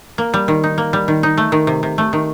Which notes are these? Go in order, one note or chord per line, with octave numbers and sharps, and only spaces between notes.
A#3
G3
D#3
D#4
A#3
G3
D#3
D#4
A3
D#3
C3
C3
A3
D#3